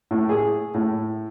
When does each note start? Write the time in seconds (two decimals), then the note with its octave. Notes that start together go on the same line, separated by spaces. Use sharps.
0.11 A2
0.29 G#4
0.74 A2